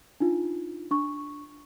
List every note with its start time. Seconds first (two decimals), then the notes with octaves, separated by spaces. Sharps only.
0.20 D4 D#4 F4
0.91 D4 C#6